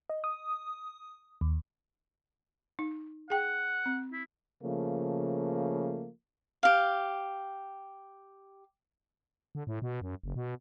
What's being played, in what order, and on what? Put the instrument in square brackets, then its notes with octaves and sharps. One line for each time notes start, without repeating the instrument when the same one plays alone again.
[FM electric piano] D#5
D#6
D#2
[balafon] D#4
[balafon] G#4 G5 [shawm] F#5
[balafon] C4
[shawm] E4
[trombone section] C#3 F3 A3 A#3
[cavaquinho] G4 F5
[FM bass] D3
A2
B2
F#2
F#1
B2